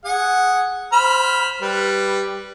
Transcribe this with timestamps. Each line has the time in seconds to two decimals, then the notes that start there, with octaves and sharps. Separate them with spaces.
0.05 G#4 F#5
0.93 C5 B5 F6
1.61 G3 B4